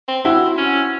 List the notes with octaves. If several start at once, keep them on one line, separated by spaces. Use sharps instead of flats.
C4
C4 E4 F#4
C#4